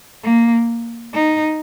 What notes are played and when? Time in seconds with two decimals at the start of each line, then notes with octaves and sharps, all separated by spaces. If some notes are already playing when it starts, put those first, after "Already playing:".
0.24 A#3
1.14 D#4